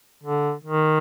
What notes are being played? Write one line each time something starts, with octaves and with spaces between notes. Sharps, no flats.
D3
D#3